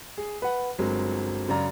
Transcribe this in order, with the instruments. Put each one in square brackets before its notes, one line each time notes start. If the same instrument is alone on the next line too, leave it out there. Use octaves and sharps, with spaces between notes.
[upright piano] G#4
B4 F#5
G1 F#3 G#3 C4 A#4
F#2 C#3 D5 A#5